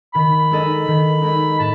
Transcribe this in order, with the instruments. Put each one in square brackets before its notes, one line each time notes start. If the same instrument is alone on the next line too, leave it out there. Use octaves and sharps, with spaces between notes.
[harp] D#3 [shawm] B5
[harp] G#3 D#4 A4 D#5
D#3
G#3 D#4 A4 D#5
[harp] A2 [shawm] A5